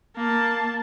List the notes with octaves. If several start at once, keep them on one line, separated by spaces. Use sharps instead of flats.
A#3 A5